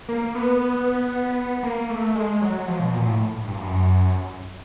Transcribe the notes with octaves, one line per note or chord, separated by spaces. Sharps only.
A#3
B3
A#3
A3
G#3
F#3
F3
B2
A#2
A2
G2
F#2